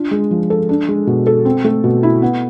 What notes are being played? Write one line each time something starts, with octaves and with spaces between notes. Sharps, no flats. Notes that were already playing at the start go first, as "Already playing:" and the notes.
Already playing: D4 F4
G#3
F3
A4
D4
G#3
B2
A4
C4
A3
B2
E4
B3